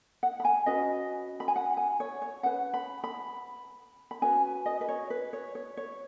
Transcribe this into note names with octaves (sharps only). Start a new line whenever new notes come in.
F#5
B5
G#5
C#4 F#4 B4 D#5
B5
G#5
F#5
G#5
C#5
C#5
C#4 B4 F#5
B5
B5
B5
C#4 F#4 B4 G#5
D#5
B4
C#5
B4
C#5
C#5
C#5